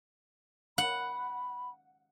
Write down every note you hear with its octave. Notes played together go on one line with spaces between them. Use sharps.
F#5 B5